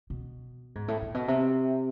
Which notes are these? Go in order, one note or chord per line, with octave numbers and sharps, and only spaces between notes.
B2
G#2
A2
A#2
B2
C3